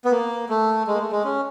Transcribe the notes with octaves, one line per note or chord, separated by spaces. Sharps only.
B3
A#3
A3
G#3
A#3
A3
G#3
C#4